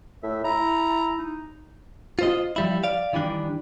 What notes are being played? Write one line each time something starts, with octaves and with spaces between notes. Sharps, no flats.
A2 E5
E4 A#5
D#4
F4 C5 D#5
F3 G3 E4
D5 F5
D#3 E3 G3 D4